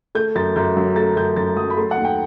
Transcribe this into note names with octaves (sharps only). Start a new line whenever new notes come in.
A3 G6
F#2 A6
F#2 G6
F#3
A3 A6
F#2 G6
F#2 A6
F#3 D#6
B5
A3 C6
F#5
D#2
G5